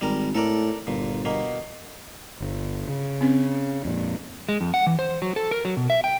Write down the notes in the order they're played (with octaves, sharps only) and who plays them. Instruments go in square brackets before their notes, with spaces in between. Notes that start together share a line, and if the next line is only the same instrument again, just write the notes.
[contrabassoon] G#1 [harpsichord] G3 A#4
[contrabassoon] A2 [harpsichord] A4 A#4 D5
[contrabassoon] G1 [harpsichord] A#2
[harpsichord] B2 A#3
[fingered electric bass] G1
C#3
[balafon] C4 C#4
[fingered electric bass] F2 A#2
[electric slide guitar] G#3
F2
F#5
E3
C5
F#3
A4
A#4
F#3
B2
E5
G5